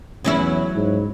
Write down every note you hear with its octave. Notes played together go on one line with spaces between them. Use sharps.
E2 F#3 C#4 E4
G#2